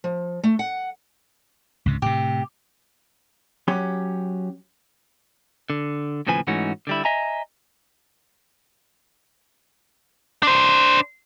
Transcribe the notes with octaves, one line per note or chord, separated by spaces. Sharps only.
F3
A3
F#5
C#2 G#2 C3
A2 C3 G4
F#3 C#4 G4
D3
D#2 A2 C#3 F3 B4 G#5
G#2 E3 A3 C#4 D#4 F#4
D3 G3 E4
D#5 E5 G#5 A#5
D4 C5